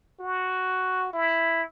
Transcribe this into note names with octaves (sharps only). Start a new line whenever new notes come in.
F#4
E4